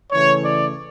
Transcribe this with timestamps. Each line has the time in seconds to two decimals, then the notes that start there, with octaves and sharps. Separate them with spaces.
0.12 C#3 E3 A3 C#5
0.44 D5